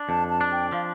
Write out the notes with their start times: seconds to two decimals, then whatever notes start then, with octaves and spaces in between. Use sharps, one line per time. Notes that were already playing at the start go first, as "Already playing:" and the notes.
Already playing: D4
0.09 F2 A5
0.29 A5
0.41 D4
0.52 G5
0.72 F3 F5